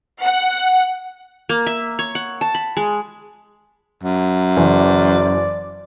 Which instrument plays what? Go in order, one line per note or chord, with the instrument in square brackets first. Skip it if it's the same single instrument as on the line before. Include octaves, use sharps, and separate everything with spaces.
[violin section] F#5
[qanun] A#3
E5
C#5
F#5
A5
B5
G#3
[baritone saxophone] F#2
[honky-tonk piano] F#1 E3 [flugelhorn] D5